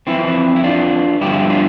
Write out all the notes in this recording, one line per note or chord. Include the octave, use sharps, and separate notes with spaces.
F2 E3 C4 E4
E4
D4 F4
G2 D3 F3 E4 G4
D4 F4